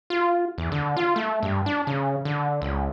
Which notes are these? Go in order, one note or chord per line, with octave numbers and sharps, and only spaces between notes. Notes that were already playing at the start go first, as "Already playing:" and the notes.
F4
E2
D3
F4
A3
G2
D4
C#3
D3
C#2